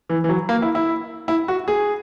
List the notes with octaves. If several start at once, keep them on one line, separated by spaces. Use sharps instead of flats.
E3
E3
F#3
A#3
E4
E4
E4
F#4
G#4